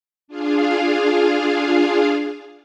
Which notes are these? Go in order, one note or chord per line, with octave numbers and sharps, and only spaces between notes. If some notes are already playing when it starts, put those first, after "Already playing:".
D4 F4 G#4 F5